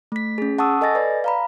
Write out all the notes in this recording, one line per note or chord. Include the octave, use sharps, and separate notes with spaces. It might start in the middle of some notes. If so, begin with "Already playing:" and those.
A3 B6
C#4 G#4
F#5 A5 C#6 D#6 E6
A4 D#5 G#5 A6 A#6
B4 D5
F5 A#5 B5